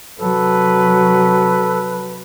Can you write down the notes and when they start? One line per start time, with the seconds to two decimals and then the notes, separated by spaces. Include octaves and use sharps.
0.20 C3 F#3 A4 B4